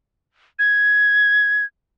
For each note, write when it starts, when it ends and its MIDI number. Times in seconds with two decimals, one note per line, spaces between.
0.59 1.65 92